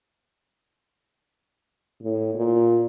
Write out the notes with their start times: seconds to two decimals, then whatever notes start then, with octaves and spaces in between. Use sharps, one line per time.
2.02 A2
2.35 A#2